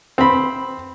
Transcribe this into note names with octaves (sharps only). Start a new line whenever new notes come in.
C4 B5